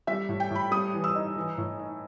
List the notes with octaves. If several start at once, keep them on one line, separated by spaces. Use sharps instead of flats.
G3 E5
A2
G5
A2 B5
G3 D#6
E3
E6
D#4
E3
A2
D#4